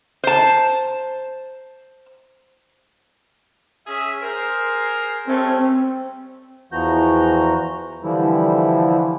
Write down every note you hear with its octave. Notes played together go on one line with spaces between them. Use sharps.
C5 A5
C#4 G#4 E5
G#4 A#4 C5
G3 A3 C4 C#4
E2 E3 F3 F#4 A#5 G6
D3 E3 F3 G3 E4